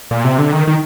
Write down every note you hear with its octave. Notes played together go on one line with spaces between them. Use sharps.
A#2
C3
D3
D#3
D#3